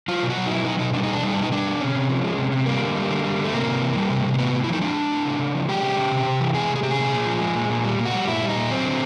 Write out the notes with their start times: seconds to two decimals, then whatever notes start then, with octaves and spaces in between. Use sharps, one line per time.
0.08 F#3 F4
0.23 B2
0.30 F#4
0.37 F#3
0.46 D#4
0.50 B2 E4
0.65 F#3 D#4
0.79 B2 D#4
0.94 G3 D4
1.03 B2 D#4
1.13 D4
1.23 G3 D#4
1.32 D4
1.37 B2
1.43 D#4
1.52 G3 D4
1.66 B2
1.80 C3 C#4
1.95 C3
2.09 F3
2.24 G#3
2.38 C3
2.52 C3
2.66 G3 A#3
2.81 D3
2.95 G3
3.10 D3
3.24 G3
3.39 D3
3.44 A3
3.53 C3 A#3
3.67 C3
3.81 E3
3.96 G3
4.10 C3
4.25 C3
4.34 A#3
4.38 A2 B3
4.53 A2
4.64 E4
4.68 F3 D#4
4.82 G#3 D4
4.96 A2
5.12 A2
5.25 C#3
5.39 C#3
5.54 F3
5.69 G#3 G4
5.82 C#3
5.97 C#3
6.11 C3
6.26 C3
6.40 E3
6.54 G#3 G#4
6.70 C3
6.76 G#4
6.83 C3 G4
6.91 G#4
6.98 A#2
7.12 A#2
7.27 F3
7.41 G#3
7.55 A#2
7.69 A#2
7.84 G3
7.99 A#2
8.06 F#4
8.13 G3
8.27 A#2 E4
8.42 G3
8.49 D#4
8.56 A#2
8.70 F#3 C4
8.84 D3